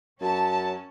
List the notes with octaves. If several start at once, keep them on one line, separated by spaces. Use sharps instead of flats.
F#2 C#4 A5